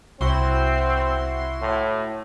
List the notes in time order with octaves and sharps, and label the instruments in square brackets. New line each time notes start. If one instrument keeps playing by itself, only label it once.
[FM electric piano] C2 [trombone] C4 [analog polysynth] E4 F#4 C6
[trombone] A2